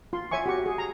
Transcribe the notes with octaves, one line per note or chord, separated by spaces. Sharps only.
F4 C6
C#5 E5 G#5 C#6
F#4 G4 C#6
G#4
A#5